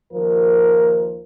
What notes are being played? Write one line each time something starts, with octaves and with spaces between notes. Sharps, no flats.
D#2 F3 A#4